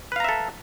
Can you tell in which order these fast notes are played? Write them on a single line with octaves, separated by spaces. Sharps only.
B4 F5 A#5 E5 A4